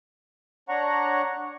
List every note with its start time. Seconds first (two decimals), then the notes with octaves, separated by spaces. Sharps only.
0.69 D4 C#5 F#5 A#5 C#6